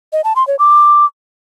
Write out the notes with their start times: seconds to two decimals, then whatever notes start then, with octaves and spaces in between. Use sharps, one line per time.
0.13 D#5
0.24 A5
0.36 C6
0.47 C#5
0.59 D6